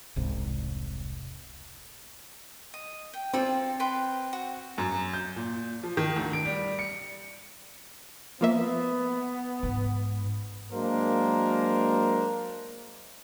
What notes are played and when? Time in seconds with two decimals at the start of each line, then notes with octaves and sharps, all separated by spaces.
0.16 E1 C2 G#2 C3
2.74 D#5
3.14 G5
3.33 C4 F4 A4 D5
3.80 B4 G5 C6
4.33 F#4
4.78 F#2
5.13 G6
5.36 A#2
5.83 F3
5.97 D#3
6.16 D2
6.33 D7
6.45 G3
6.79 C#7
8.41 F3 A#3 B3 E5
9.63 G#2
10.72 F#3 G#3 A#3 D4 A#4 C5